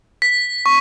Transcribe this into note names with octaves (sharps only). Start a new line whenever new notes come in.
B6
C#6